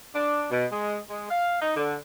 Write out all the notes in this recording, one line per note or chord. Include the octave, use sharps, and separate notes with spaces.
D4
B2
G#3
G#3
F5
D#4
D3